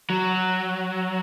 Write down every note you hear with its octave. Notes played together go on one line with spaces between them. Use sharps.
F#3